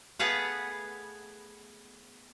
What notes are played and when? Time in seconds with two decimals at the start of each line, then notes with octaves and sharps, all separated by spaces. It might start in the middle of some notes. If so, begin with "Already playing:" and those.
0.19 A3 B3 G#4 B4 F5 F#5